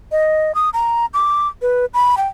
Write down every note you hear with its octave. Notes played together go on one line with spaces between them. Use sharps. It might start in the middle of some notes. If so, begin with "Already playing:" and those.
D#5
D#6
A#5
D6
B4
B5
G5